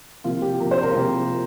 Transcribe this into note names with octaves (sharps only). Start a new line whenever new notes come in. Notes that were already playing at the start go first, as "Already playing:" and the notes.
C3 F3 A#3 F4
G4
C3 F3 A#3 A#4
C5
A#4
F4
C3 F3 A#3 G4